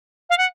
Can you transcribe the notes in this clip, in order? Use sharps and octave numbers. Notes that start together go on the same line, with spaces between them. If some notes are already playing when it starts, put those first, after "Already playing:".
F5
F#5